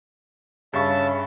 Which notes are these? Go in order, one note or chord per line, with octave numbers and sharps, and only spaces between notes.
G2 C#3 E5 A5 C#6